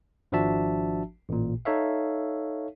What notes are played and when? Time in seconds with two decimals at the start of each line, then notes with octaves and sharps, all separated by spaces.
0.32 G#1 F3 D4 F#4 E5 A5
1.29 A1 A#2
1.65 D#4 A4 C#5 E5 F5